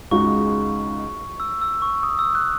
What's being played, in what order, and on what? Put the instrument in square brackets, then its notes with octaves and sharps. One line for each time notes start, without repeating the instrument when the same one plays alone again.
[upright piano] C#2 C#3 G#3 D#4 F#4 [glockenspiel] C#6
[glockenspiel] E6
E6
C#6
D#6
E6
F#6